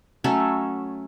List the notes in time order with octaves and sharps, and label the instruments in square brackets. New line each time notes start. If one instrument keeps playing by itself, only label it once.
[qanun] F#3 A3 C#4 A4